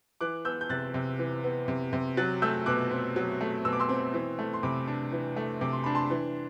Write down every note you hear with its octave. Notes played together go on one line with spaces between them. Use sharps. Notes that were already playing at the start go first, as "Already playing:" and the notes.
E3 D6 F#6
B3 E6 G6
G6
C3 F#6 A6
C3
E3
B3
C3
C3
F#3 F#6 A6
A3 E6 G6
B2 D6 F#6
C4
F#3
A3
B2 E6
D6
C6 E6
C4
E3
A3
C6
C3 B5 D6
D4
E3
A3
C3 D6
C6
D4 B5
A5 C6
E3